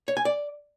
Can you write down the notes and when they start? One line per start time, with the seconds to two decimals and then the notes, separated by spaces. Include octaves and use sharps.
0.08 C#5
0.17 G#5
0.25 D5